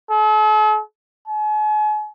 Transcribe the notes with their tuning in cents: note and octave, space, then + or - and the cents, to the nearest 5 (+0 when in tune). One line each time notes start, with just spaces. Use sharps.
A4 -45
G#5 +40